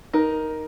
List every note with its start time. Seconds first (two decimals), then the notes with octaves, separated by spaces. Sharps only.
0.13 D#4 A#4